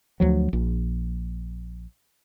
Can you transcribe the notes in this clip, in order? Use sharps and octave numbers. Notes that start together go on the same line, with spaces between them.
D2 F3 F#3
A#1